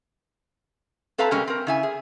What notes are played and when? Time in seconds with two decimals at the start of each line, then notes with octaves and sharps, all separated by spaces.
1.18 C4 A4 B4 F5 A5 A#5
1.31 C3 G3 G#3 A#3 C#4
1.47 C4 A#4
1.67 C#3 E4 G#5
1.83 G#4